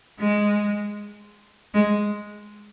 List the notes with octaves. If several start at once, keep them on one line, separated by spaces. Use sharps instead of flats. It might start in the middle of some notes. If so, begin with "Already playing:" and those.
G#3
G#3